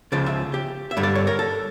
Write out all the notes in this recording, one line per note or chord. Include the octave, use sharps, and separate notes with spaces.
C#2 C#3 F3 D5
E5
G4
E5
G2 D3 G3
D5
C#5
A#4
A4